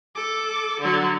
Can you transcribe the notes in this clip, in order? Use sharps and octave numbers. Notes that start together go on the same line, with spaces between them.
A4 D6
D3 F#3